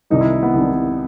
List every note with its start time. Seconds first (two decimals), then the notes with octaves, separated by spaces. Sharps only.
0.10 C2 C3 D#3 G3 D#4
0.21 E4
0.43 B3
0.53 C2 C3 D#3 G3